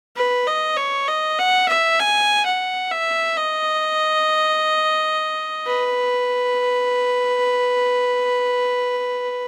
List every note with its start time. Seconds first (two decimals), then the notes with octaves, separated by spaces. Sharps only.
0.16 B4
0.47 D#5
0.77 C#5
1.08 D#5
1.39 F#5
1.68 E5
1.99 G#5
2.45 F#5
2.91 E5
3.37 D#5
5.67 B4